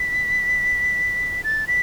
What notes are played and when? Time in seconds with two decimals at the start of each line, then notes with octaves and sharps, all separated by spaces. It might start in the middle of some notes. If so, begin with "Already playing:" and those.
Already playing: B6
1.44 A6
1.67 B6